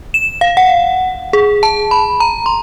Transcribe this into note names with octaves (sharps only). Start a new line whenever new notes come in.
E7
F5
F#5
G#4
A5
B5
A#5
C6